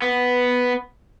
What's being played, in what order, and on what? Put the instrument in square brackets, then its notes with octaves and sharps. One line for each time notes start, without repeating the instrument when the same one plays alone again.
[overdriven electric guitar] B3